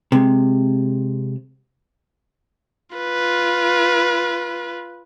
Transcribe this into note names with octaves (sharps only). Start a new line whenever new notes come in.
C3 G#3
F4 B4